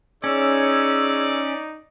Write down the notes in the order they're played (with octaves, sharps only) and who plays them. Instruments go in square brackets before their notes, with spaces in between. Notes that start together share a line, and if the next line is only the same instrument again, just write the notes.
[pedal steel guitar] C#4 [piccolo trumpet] D#4 [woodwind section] G#4 C#5 E6 [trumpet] D5